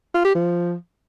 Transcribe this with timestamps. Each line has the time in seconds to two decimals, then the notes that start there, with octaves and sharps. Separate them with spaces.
0.14 F4
0.25 G4
0.35 F3